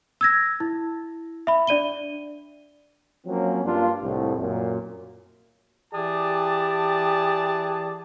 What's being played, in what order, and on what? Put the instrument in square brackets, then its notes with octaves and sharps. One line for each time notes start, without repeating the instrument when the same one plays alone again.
[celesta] E6 G#6 A#6
E4
E5 B5
D4 D5 D#7 G7
[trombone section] F3 F#3 A#3 C4 C#4
G2 A#3 D4 F4
C2 A2
F#2 A#2
[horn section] E3 G4 G#4 D5 A5